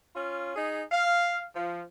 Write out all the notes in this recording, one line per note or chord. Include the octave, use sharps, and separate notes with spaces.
C#4 F4
D#4 G#4
F5
F3